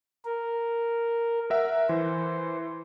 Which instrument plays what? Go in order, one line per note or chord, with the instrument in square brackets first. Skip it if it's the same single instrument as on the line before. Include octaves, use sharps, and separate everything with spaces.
[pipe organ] A#4
[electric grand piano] A#4 E5 F#5
[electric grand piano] E3 [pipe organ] C5